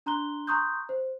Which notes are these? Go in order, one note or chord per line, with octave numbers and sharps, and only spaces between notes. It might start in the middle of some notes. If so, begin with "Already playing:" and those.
D4 A#5 C6 F#6 G7
A#5 C6 C#6 D#6 F#6 G6
C5